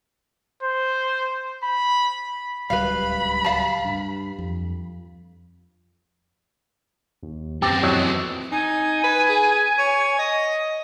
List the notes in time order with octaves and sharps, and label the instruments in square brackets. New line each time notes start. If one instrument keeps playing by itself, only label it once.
[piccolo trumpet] C5
B5
[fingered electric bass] D1 C#2 G3 [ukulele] B4 F5 [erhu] B5
[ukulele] F5 A5
[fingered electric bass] G2
F2
[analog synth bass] D#2
[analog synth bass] F#2 [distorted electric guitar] B3 C4 [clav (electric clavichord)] G4 [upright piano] E6 A6 A#6
[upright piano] F2 E3 E6 [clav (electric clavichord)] F#3 D#5
[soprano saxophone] D#4 [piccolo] G#5
[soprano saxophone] B4
G#4
C#5
D#5